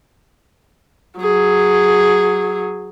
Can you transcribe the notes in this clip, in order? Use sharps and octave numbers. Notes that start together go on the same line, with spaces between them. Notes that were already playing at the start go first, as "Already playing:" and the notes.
F#3 G#4